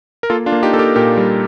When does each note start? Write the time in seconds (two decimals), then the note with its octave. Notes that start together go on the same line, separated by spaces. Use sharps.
0.23 A#4
0.30 A#3 F4 A4
0.46 D4 F4
0.52 A#3
0.63 D#4 G4
0.73 A#3 A4
0.79 G4 A#4
0.95 A#2 G4 A#4
1.17 G3